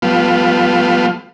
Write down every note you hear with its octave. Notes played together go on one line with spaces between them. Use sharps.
F3 G3 A3 B3 F4